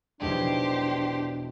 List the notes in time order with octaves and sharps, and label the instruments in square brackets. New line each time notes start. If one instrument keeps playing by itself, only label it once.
[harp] B1 E2 G#3 [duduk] D4 [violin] G4 C5